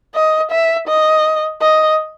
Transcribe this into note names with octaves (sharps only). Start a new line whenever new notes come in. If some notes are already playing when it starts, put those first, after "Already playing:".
D#5
E5
D#5
D#5